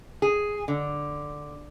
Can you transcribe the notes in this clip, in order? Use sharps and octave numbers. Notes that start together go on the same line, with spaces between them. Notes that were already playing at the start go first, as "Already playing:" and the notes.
G#4
D3